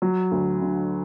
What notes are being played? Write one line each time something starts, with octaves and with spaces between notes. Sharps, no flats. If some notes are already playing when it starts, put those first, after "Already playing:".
F#3
D2
D3